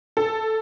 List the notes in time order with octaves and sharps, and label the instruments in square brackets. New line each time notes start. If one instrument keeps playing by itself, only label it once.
[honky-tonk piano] A4